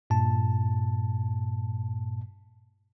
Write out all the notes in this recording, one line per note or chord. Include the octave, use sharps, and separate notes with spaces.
G2 A#2 A5